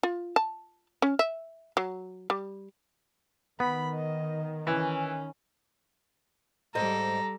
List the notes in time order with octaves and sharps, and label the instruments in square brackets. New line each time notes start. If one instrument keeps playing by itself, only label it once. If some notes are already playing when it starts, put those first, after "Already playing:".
[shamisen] F4
A5
C#4
E5
F#3
G3
[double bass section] D#3 [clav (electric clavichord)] B3 [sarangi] B5
[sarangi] D#5
[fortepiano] E3 [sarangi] C#4
[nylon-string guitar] G#2 C5 D#5 [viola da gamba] G3 A4 [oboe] A#5